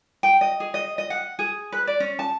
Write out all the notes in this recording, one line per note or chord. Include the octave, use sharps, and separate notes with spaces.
G5
D#5
G#4
D#5
D#5
F#5
G#4
B4
D5
C#4
A5